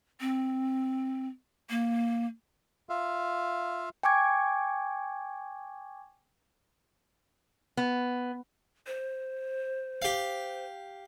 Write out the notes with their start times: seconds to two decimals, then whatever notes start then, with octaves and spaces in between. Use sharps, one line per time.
0.21 C4
1.70 A#3
2.89 F4 E5 F5
4.03 G5 G#5 C#6 D6 G#6
7.77 B3
8.87 C5
10.02 G4 F5